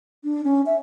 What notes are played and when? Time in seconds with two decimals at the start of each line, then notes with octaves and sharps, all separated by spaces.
0.24 D4
0.44 C#4
0.66 E5